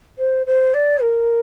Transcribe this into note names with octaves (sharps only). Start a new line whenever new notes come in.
C5
C5
D5
A#4